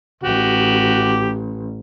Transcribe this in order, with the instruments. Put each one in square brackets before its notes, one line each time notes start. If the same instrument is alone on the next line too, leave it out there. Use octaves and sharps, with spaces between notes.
[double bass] A1 [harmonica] F#4 G4